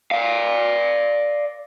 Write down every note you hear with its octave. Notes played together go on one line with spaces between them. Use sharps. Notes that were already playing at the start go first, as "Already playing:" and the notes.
D5 F5